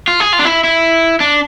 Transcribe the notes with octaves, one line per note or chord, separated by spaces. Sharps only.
F4
G#4
F4
D4
E4
E4
D4